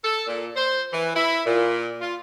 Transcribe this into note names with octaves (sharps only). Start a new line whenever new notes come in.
A4
A#2
C5
E3
E4
A#2
F4